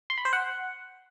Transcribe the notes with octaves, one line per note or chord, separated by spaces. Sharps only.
C6
B5
C5
F#5